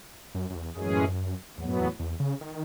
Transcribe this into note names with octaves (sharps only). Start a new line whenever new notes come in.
F#2
F#2
E2
F#2 A2 E3 G#3 C#4 G#4
E2 A2 F#3 B3
F#2
E2
E2
C#3
D#3